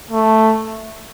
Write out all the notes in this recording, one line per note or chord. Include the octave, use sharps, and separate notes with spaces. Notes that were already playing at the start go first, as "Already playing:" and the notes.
A3